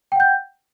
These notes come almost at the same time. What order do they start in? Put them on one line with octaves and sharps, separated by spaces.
G5 F#5 G6